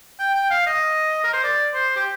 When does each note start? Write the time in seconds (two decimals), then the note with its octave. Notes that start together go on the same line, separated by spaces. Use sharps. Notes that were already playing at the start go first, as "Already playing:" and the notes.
0.19 G5
0.35 G5
0.51 F5
0.67 D#5
1.24 A#4
1.33 C5
1.43 D5
1.74 C5
1.96 G4